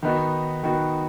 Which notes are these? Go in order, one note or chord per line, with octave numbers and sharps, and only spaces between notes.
D#3 B3 D#4 F#4
D#3 B3 D#4 F#4